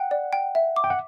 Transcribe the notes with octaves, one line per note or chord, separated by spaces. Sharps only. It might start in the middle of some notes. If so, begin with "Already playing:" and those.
Already playing: F#5 G5
D5
G5
E5
D6
G5
F#5